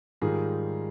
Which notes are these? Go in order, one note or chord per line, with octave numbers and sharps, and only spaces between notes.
G#2 D#3 G3 F4 G#4